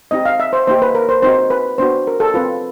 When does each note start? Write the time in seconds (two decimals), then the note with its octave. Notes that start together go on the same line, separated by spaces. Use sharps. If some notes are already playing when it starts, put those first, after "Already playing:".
0.11 C4 D#4 G4 D#5
0.25 F5
0.40 E5
0.53 C5
0.67 A#3 D#4 G4 C5
0.82 B4
0.95 A#4
1.09 C5
1.22 C4 D#4 F#4 C5
1.50 B4
1.78 B3 D4 F#4 C5
2.07 A#4
2.20 A4
2.34 C4 F4 B4